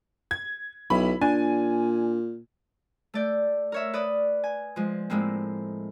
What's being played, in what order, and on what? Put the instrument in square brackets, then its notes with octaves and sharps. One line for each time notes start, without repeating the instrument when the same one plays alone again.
[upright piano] G#6
[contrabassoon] B1 [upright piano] E4 B5
[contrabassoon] A#2 [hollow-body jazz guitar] D4 [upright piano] G#5
[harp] A3 D5 G6
A#4 C#5 E5
B4 D5 D#6
G#5
F3 G#3
A2 G#3 A#3 C4